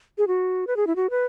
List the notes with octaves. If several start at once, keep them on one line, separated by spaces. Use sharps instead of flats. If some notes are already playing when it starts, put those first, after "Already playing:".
G#4
F#4
B4
G#4
E4
F#4
B4